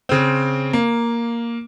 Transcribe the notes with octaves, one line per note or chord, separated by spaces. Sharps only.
C#3 C4
A#3